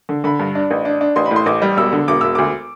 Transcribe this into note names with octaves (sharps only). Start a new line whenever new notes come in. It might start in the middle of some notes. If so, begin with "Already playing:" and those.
D3
D3 B5
G2
D4
A1
D4
D4
A1 C6
B5
A2
C6
A1 D6
G3
E1 E6
D3
E1 D6
E1 E6
D2 D6